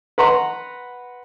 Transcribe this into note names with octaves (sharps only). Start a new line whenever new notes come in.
B4 F#5 A#5 C6